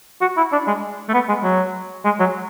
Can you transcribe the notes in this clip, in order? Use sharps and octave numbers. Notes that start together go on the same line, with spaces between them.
F#4
E4
D4
G#3
A3
B3
G#3
F#3
G#3
F#3